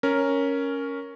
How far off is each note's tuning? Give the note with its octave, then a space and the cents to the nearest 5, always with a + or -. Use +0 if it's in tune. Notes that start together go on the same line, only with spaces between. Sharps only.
C#4 +0 A#4 +0